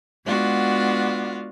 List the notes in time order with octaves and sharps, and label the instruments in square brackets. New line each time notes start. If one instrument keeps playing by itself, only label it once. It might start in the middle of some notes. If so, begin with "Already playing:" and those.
[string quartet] G#3 B3 D4 F4 F#4